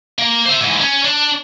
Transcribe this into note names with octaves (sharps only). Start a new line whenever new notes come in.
A#3
C5 E5
G#2 E3
C#4
D4